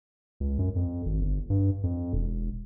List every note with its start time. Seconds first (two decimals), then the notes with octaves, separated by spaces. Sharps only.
0.40 C#2
0.59 F#2
0.76 F2
1.05 G#1
1.21 G1
1.50 G2
1.83 F2
2.13 E1